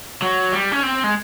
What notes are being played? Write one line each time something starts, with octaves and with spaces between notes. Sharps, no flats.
F#3
G3
C#4
C4
G#3